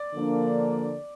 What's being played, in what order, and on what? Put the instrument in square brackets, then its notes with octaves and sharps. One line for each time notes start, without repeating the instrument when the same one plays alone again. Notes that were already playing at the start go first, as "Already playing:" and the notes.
Already playing: [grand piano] D5
[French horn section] D3 F3 A#3 D4